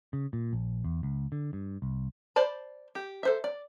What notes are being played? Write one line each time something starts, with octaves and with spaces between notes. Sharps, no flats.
C#3
A#2
A#1
E2
C#2
D3
G2
C2
C5 D5 A5 B5
G4
A4 C5 E5
D5